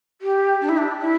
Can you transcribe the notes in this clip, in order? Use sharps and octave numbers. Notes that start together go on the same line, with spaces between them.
G4
D4
E4
D4
E4